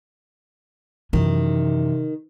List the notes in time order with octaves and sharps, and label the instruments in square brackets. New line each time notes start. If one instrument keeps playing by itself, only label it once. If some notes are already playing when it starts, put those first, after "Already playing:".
[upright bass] F#2 E3 [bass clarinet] C3 [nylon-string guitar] D#3